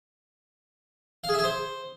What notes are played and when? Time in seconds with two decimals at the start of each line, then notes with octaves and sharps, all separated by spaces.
1.24 F5
1.29 G#4
1.34 E5
1.39 G#4
1.44 C5